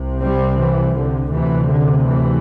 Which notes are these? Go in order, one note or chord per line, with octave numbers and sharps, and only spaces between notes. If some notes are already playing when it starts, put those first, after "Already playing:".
Already playing: C2 C3
G3 C4
E3
D3
D2 C3 E3
D3
E3